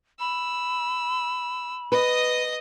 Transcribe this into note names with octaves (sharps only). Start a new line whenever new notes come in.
B5 E6
B4 D#5 D#6